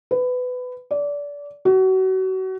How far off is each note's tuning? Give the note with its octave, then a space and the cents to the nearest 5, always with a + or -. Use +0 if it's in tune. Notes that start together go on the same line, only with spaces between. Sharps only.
B4 +20
D5 -25
F#4 +30